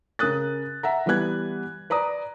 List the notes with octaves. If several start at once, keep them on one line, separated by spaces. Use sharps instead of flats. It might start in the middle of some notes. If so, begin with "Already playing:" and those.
C#3 A#4 D#6 F#6 A6
E5 F#5 A#5
E3 G3 B3 B4 F#6 G#6
B4 D5 A#5 D#6